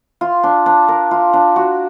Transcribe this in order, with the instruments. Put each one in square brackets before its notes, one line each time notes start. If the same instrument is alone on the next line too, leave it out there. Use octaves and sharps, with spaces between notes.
[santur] F4
D4
D4
A#4
F4
D4
F#4